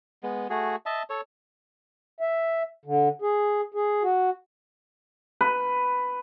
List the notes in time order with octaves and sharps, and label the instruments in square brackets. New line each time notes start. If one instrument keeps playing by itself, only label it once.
[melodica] G#3 B3
A3 F#4 G#4
D#5 E5 A5
A4 C#5
[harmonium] E5
D3
G#4
G#4
F#4
[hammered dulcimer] B4